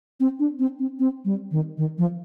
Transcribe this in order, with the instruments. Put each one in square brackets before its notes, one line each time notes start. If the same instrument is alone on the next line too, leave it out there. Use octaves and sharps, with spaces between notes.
[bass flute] C4
D4
C4
C4
C4
G3
D#3
D#3
F3